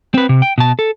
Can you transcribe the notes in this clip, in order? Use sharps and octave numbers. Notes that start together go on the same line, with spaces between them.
C4 B4
C3
G5
B2 A5
A4